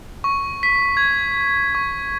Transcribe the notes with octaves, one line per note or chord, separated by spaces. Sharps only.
C#6
B6
G#6
C#6